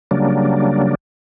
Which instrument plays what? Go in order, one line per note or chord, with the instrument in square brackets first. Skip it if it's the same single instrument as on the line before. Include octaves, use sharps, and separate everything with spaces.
[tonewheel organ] C#3 F#3 G3 A#3 D4